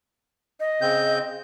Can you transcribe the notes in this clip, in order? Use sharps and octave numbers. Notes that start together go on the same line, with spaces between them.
D#5
C#3 C4 G6